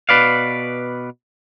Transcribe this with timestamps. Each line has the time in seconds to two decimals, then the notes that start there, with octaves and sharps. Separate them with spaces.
0.09 B2 B4 D5 F5